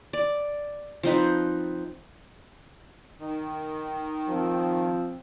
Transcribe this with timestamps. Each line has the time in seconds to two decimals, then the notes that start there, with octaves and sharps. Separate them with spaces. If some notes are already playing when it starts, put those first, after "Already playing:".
0.13 D5
1.03 F3 C4 D#4 B4
3.20 D#3
4.29 F3 C4